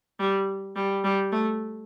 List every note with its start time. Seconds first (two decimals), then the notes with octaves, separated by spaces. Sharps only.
0.19 G3
0.76 G3
1.04 G3
1.32 A3